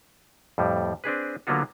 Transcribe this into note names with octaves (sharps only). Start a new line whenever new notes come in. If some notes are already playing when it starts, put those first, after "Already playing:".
F2 A2 G3
C4 D4 G#4 B4
D3 F#3 A#3 B3 F4 F#4